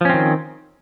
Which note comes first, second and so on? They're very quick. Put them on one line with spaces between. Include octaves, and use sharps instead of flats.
F3 C#4 C4 D#3